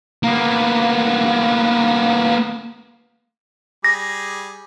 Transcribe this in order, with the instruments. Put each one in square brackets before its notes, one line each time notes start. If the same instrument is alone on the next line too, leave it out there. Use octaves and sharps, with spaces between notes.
[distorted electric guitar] A#3 B3
[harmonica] G3 G#4 [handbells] A#6